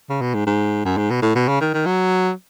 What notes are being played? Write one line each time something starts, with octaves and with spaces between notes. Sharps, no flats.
C#3
B2
G#2
G#2
F#2
G#2
B2
A2
B2
C#3
D#3
D#3
F#3